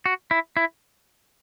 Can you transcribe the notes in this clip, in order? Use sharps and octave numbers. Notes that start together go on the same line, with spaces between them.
F#4
E4
E4